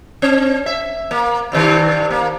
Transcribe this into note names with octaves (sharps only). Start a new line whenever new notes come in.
C4
E5
A#3
G2 C3 D#3
A#3